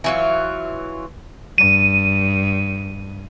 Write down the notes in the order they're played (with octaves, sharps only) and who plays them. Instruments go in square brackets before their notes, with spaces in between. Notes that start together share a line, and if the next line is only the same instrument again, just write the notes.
[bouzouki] E3 F#3 F4
[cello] G2 [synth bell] D#7